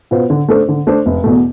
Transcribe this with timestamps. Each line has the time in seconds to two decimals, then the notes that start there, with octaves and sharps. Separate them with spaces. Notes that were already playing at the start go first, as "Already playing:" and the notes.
0.11 B2 B3 F4 C5
0.30 D3
0.48 A3 D4 A4 C5
0.68 D3
0.87 A3 D4 A4 C5
1.06 F1
1.24 E2 B2 A3